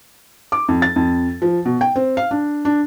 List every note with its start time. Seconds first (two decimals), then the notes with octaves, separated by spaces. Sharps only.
0.52 D6
0.68 F2
0.82 A6
0.96 F2
1.42 F3
1.65 B2
1.81 G5
1.96 C4
2.17 F5
2.31 D4
2.65 D4